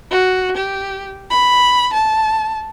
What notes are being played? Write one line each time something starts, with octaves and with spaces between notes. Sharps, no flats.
F#4
G4
B5
A5